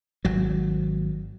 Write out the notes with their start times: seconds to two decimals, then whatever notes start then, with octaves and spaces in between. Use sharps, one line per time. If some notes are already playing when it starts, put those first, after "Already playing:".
0.25 G#1 F#3